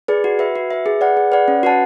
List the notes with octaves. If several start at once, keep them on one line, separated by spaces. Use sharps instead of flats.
G#4 B4 D5
F#4
B4 E5
F#4
B4 E5
G#4
B4 D5 F#5
G#4
B4 D5 F#5
C#4
F#4 B4 F#5 A5